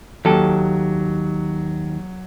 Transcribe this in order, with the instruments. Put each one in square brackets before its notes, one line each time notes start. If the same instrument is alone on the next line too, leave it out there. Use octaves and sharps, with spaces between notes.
[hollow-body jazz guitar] D#2 A4 [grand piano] F#3